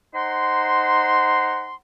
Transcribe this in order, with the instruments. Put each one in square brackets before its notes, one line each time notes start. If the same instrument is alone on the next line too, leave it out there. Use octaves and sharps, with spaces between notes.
[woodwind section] D#4 C5 F#5 A#5 C6